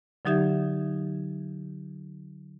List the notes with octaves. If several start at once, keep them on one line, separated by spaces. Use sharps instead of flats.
D3 F#3 D#4 G4 E5 G#6